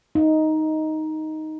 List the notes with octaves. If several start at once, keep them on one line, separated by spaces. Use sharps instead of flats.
D#4